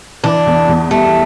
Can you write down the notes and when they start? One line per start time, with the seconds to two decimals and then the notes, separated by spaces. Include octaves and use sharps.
0.24 E3 D4
0.46 E2
0.68 E2
0.91 G3 A3